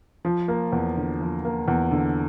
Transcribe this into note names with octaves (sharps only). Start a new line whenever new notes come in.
F3
A#3
E2
D3
F3
A#3
E2
D3